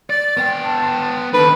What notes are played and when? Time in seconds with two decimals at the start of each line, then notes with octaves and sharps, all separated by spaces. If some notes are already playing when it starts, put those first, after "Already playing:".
0.10 D5 A6
0.37 B3 G5
0.64 A5
1.34 D#3 D4 A4 B4